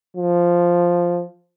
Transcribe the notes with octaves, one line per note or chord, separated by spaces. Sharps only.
F3